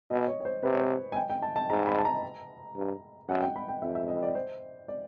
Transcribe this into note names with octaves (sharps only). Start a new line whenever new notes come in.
B2 D#5
C#5
C#5
C5
C3 B4
C#5
C5
G#5
G5
G5
A5
A5
G#2 A#5
B5
A5
A#5
G2
F#2 F#5
G5
B5
G5
F2 E5
E5
D#5
D5
C5
D5